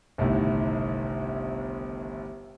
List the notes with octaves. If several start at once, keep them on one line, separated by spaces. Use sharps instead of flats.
G1 C2 A2 C3 D#3